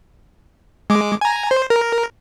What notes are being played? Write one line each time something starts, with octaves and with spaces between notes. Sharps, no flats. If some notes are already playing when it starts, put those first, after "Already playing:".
G#3 D6
G#5 A#5
C5
A#4